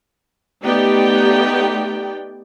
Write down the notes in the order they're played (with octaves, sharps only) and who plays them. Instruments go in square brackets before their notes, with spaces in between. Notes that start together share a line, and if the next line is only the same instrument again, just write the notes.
[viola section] A3 B3 D#4 G4 D5 G5